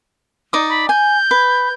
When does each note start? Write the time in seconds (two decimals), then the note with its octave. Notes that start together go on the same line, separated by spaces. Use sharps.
0.53 D#4 D5 D#6
0.69 B5
0.89 G#5 G6
1.31 B4